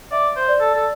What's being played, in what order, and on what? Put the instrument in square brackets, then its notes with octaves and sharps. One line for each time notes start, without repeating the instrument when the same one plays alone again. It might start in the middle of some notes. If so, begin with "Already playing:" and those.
[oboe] D5 [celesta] E5
[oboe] C5
[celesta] D5
[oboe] A4
A4